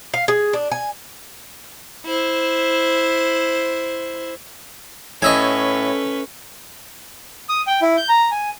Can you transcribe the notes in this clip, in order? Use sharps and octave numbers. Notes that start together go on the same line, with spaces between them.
F5
G#4
D4
G#5
E4 C5
A2 C#4 B4 D#5 E5 G#5
D#6
G5
E4
G6
A#5
G#5